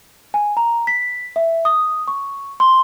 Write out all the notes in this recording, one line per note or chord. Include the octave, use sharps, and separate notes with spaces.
G#5
A#5
B6
E5
D#6
C#6
C6